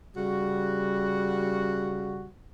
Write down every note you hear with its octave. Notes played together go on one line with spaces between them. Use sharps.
C#3 G3 F#4